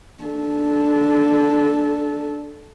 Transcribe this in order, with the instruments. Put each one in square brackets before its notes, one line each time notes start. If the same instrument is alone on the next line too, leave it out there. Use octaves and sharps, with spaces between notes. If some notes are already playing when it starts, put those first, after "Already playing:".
[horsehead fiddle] D4 A4